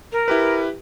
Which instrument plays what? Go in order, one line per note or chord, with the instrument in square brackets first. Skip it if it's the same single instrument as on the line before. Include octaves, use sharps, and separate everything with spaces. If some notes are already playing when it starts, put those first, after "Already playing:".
[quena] A#4
[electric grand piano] E4 G4 B4